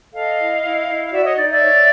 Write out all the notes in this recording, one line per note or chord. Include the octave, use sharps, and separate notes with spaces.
A4 D#5 F5
E4
E4
E4
F5
F#4 D5 E5
C#5 D#5
D#4 D5
D5 E5
C#5